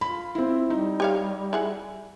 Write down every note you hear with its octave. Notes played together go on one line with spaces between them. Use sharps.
F4 B5
C4 E4
G3 D#4
G4 C#5 F5
E4 G#4 F#5